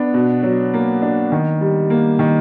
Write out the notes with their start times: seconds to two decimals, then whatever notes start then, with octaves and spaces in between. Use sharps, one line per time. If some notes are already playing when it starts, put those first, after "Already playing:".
Already playing: B3 D4
0.14 B2
0.43 F#3
0.74 A#3
1.02 D4
1.32 D#3
1.61 G3
1.90 A#3
2.19 D#3